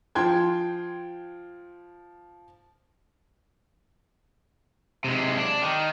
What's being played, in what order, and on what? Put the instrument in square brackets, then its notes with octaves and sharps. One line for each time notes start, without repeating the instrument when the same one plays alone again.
[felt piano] F3 G5 C6 G#6
[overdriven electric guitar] C3 G#3
D4
D#3